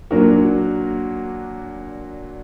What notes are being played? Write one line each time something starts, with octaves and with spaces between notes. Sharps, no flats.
A#2 F#3 D4 F#4 A#4